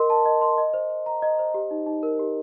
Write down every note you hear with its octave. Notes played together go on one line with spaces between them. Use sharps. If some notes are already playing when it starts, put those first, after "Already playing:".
Already playing: A#4 D#5 C6
A5
D#5
C6
D#5
C5
C5
A#5
D#5
C5
G4
D#4
D#4
A#4
G4